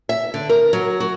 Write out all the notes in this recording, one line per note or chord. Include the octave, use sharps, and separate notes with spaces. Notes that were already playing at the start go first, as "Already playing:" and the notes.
E5
D3
A#4
F#3
F#4